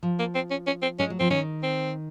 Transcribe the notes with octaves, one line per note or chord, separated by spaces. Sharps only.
F3
A#3
C4
C#4
C#4
C4
G#3 C#4
F#3
F3 C4
D#3 C#4
C4